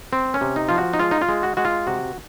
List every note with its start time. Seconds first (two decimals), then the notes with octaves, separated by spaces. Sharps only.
0.13 C4
0.34 C#4
0.41 C3
0.56 D#4
0.69 F3 F4
0.78 F#4
0.93 D#4
0.99 G#3 F4
1.11 D#4
1.21 F4
1.29 G#3
1.43 F#4
1.57 G#3 F#4
1.65 F4
1.87 C3 F#4